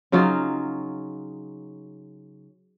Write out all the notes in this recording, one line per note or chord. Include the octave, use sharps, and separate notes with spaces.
C#3 F#3 D#4 F4